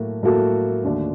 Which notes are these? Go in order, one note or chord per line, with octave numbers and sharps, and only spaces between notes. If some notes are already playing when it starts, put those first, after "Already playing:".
Already playing: A2 F#3 A#3 F#4 A4
A2 F#3 A#3 F#4 A4
D#2 D3 A3 D4 F#4